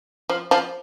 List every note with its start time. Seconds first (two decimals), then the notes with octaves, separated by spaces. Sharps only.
0.30 F3
0.51 F3